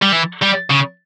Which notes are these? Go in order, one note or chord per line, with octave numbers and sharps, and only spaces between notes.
G3
E3
G3
C#3